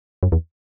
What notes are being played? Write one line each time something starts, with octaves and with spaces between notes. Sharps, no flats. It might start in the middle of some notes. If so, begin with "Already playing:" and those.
F#2
E2